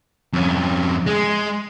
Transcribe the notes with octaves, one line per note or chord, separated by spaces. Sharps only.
F2 C#4
G#3